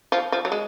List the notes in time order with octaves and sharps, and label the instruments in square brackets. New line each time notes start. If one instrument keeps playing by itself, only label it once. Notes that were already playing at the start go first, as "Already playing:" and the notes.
[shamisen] F3
F3
F#3
G#3